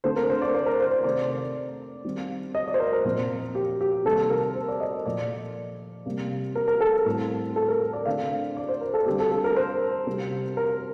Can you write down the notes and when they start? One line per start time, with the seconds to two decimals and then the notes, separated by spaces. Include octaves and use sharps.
0.04 D3 A3 C4 C5
0.17 A#4
0.30 C5
0.42 D5
0.54 C5
0.66 A#4
0.80 C5
0.91 C5
1.04 C3 D#3 A3 D5
2.04 D#3 G3 C4
2.55 D#5
2.68 D5
2.74 C5
2.80 A#4
2.93 A#4
3.04 A#2 F3 C4
3.55 G4
3.81 G4
4.05 C3 D#3 G3 A#3 A4
4.30 A#4
4.55 C5
4.68 D5
4.80 D#5
5.06 A#2 F3 A#3 D5
6.06 C3 G3 A#3
6.55 A#4
6.68 A#4
6.81 A4
7.05 A2 G3 C4
7.56 A4
7.68 A#4
7.93 D5
8.06 D3 A3 C4 F5
8.57 D5
8.69 C5
8.81 A#4
8.94 A4
9.06 D3 G3 C4 G4
9.20 A4
9.31 A4
9.44 A#4
9.56 C5
10.07 C3 G3 C4
10.57 A#4